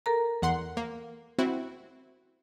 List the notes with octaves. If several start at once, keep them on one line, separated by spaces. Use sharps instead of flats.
A4 A#4 A#5
E2 F#5 C6
A#3
C4 E4 F#4